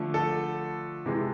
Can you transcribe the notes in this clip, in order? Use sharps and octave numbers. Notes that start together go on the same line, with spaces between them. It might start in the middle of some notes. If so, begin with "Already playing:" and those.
Already playing: D3 F3 A3
A4
C3 E3 G#3